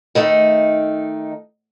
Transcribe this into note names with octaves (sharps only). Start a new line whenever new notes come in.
D#3 A3 D#4